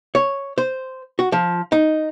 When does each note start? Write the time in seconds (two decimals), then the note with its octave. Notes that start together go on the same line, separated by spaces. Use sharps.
0.15 C#5
0.58 C5
1.19 F#4
1.32 F3
1.72 D#4